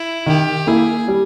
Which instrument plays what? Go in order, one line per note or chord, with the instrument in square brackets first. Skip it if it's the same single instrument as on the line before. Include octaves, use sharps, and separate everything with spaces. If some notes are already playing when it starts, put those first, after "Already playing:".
Already playing: [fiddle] E4
[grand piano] D#3 [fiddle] G4
[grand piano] A#3 E4 [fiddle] G#4
[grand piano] G3